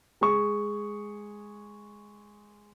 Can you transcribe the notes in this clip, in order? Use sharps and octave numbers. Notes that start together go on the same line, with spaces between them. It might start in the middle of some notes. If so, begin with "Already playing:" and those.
G#3 G#4 C#6